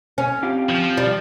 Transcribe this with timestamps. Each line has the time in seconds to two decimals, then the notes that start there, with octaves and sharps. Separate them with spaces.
0.18 C#4
0.43 C4 F4 G4
0.69 F3
0.97 G3